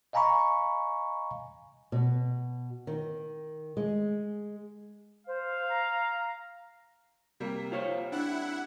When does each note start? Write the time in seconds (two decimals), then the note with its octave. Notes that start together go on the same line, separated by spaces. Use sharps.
0.13 D#5 F5 G#5 A#5 B5 C#6
1.92 B2
2.87 D#3
3.77 G#3
5.27 C5 F5
5.68 A#5
7.40 C3 G3 A#3
7.72 F4 C5 C#5
8.12 D4 E4 F#5